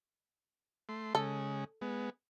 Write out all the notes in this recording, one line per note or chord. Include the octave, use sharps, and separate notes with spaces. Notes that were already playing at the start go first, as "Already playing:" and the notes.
A3 C6
C#3 G#3 A4
G#3 B3